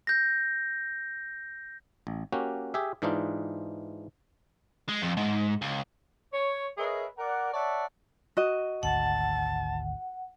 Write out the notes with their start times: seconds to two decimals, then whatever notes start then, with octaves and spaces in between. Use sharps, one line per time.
0.07 G6 A#6
2.07 A1
2.32 A#3 C#4 F#4 G4
2.74 G4 G#4 E5
3.02 G#2 E3 D4 D#4 F4
4.89 G#3
5.02 F2
5.17 G#2
5.62 C#2
6.32 C#5
6.78 G#4 A#4 B4 C#5 D#5 E5
7.18 A#4 D5 F#5
7.53 C#5 D5 E5 F#5 A5
8.37 F#4 D#5
8.83 G#1 D2 F#5 A5